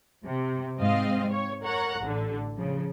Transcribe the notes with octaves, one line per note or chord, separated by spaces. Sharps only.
C3
G#2 C4 D#5 F5
C#5
A#4 C#5 F#5 A#5
A1 D3
C#3 F3